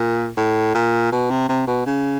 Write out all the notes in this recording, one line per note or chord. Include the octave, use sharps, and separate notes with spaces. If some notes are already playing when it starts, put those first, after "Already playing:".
Already playing: A#2
A2
A#2
B2
C3
C3
B2
C#3